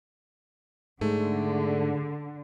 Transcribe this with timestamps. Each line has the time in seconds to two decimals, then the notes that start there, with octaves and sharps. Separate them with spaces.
1.01 G#2 D3 A3 G#4